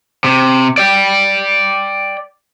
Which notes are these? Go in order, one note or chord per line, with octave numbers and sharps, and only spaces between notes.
C3
D5 G5